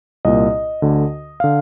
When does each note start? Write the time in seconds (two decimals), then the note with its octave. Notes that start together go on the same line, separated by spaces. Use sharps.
0.25 C2 A#2 D#5
0.82 D2 D3
1.40 D3 F5